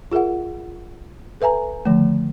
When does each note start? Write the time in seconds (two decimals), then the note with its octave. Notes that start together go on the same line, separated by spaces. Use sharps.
0.12 F4 G#4 A#4 E5 F#5
1.41 A4 B4 E5 G#5 A#5
1.85 D3 D#3 F3 A3